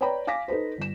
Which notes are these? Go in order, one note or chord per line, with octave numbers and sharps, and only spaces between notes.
B4 C#5 D5 G5 A#5 B5
F5 G#5 D6 A#6 B6
D#4 A4 B4 C5
G1 E7